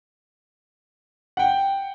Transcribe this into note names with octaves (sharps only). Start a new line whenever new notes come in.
F#5 G5